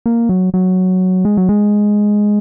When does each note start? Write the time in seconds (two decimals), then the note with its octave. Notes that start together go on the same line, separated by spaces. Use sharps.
0.06 A#3
0.29 F#3
0.54 F#3
1.25 G#3
1.37 F#3
1.49 G#3